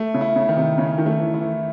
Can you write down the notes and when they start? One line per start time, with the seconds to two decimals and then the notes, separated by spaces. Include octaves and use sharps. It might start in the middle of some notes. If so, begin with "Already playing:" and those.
Already playing: A3
0.14 C#3
0.21 E4
0.36 C#3
0.49 D#3
0.57 C3
0.78 C#3 C#4
0.98 D#3
1.06 A3
1.20 E3
1.34 E4
1.41 E3